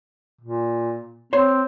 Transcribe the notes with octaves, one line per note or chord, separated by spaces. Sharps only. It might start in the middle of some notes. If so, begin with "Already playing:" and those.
A#2
C4 C#5 C6